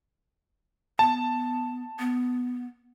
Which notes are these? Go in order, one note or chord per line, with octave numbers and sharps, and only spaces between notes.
B3 A5
B3